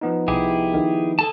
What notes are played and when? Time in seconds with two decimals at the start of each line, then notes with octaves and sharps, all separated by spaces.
0.01 F3 B3 D#4
0.28 C2 E4 G4 G#4
0.74 D#3
1.19 G#4 A4 A5